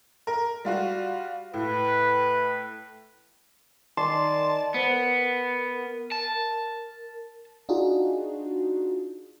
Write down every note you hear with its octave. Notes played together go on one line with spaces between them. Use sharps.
A#4
G3 F4 F#4
A2 B4
D#3 D5 A5 C6
B3 C5
A#4
A5
D4 D#4 F4 F#4 G#4